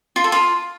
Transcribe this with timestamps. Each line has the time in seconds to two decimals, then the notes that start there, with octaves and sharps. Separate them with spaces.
0.16 F4
0.24 A4
0.32 F4